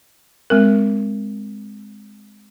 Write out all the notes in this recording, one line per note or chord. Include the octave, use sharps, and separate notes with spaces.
G#3 C4 A#4